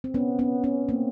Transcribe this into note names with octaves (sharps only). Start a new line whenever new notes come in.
C4
B3 C#4
B3 C#4
B3 C#4
A#3 C4